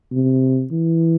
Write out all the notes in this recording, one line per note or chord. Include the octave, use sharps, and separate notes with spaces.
C3
E3